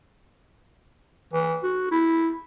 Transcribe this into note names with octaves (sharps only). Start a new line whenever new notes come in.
E3
F#4
E4